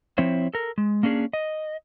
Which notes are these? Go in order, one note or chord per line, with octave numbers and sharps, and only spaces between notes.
F3 C4 E4 C5 C#5
A4 A#4
G#3
A#3 C#4 D4 G#4
D#5